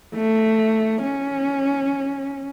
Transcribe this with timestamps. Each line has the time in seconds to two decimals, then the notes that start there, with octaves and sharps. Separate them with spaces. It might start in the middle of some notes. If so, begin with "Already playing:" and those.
0.14 A3
1.03 C#4